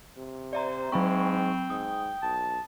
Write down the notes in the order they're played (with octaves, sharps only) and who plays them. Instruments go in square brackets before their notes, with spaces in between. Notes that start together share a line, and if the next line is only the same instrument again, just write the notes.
[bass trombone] C3
[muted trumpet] C5 [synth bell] D5 E5 A#5
[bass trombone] G#2 [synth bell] F#3 B5 C#6 [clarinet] C4
[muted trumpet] G5
[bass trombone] G#2 [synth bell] D#6
[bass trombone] B1 [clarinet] A5